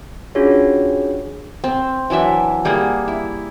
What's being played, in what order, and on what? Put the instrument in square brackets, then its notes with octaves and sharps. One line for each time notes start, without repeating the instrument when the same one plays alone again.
[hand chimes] C#4 D4 F4 F#4 G#4 C#5
[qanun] C4
E3 F#3 D4 E5
G3 A#3 G#4 F#5
E4